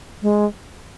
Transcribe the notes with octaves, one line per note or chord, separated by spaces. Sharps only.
G#3